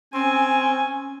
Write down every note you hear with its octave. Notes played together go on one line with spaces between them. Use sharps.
C4 C#4 G#5